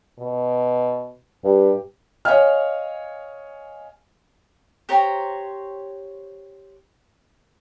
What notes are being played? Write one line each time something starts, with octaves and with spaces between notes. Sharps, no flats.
B2
G2 G4
C#5 D#5 F5 G#5 F6
G4 C5 C#5 A#5